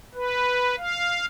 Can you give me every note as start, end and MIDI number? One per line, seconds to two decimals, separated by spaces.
0.14 0.76 71
0.78 1.25 77